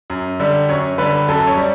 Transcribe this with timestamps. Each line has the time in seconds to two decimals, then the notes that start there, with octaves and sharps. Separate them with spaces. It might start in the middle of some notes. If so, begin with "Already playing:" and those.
0.10 F#2
0.40 D3 G3
0.69 F#2 C#5
0.98 D3 G3 B4
1.28 F#2 A4
1.47 C#5
1.57 G3